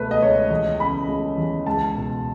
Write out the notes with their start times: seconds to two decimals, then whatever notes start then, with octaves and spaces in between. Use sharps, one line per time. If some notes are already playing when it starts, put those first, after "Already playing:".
Already playing: C#2 B2 A3 B4
0.11 D#5
0.22 C#2 C#5
0.50 E2 D#5
0.79 C#3 B5
1.08 G#3
1.38 E2
1.66 C#2 A5
1.95 B2